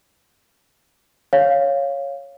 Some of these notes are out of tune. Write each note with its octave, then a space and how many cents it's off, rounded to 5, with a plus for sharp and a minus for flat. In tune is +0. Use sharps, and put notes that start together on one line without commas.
C#5 +0 F5 +0